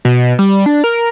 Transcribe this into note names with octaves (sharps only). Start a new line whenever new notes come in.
B2
G3
D4
A#4